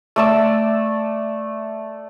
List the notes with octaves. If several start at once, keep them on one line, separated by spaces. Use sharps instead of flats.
A3 D5 E6